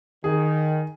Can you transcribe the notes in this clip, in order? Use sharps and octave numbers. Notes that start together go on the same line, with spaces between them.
D#3 G#4